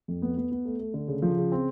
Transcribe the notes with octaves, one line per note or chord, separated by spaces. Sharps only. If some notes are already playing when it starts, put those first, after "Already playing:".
F2
B3
B3
B3
A3
A3
D3
C#3
F3
C#3
C4